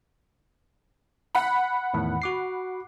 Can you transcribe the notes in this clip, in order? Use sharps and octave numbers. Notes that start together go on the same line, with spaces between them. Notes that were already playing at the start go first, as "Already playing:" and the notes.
F#5 B5
E2 A2 D#3
F#4 D6 C7